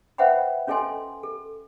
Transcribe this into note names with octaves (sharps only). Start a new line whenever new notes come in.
B4 C5 E5 F#5 G5 B5
C#4 F4 A4 D#5 G#5 C6
A4